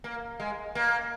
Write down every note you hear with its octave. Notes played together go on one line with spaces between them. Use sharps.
A#3
G#3
A#3